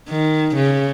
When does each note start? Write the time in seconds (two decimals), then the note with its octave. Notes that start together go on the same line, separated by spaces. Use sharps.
0.09 D#3
0.56 C#3